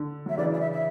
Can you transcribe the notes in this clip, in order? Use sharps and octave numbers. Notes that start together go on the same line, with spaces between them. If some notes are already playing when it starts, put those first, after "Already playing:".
Already playing: D3
F#3 E5
C#3 E3 D5
D5
E5
E5